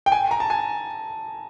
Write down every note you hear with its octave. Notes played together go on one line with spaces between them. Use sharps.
G5
G#5
A#5
A5
G#5